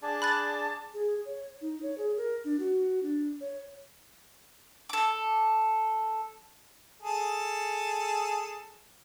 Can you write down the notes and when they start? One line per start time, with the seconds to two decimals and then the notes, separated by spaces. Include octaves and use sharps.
0.02 D4 G#4 D5 A5
0.22 B5 F#6 A6
0.94 G#4
1.26 C#5
1.62 D#4
1.82 C#5
1.98 G#4
2.17 A#4
2.44 D4
2.59 F#4
3.03 D4
3.41 C#5
4.89 A4 D6
7.02 G#4 A4